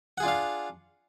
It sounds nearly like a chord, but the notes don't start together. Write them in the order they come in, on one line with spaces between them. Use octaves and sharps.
F#5 G#4 F4 D4 F5